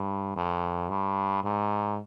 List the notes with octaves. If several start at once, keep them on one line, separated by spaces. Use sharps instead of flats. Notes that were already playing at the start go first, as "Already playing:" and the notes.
Already playing: G2
F2
G2
G#2